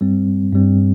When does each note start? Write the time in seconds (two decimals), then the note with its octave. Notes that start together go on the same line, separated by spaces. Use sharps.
0.01 G2 G3 C4
0.53 G2 G3 C4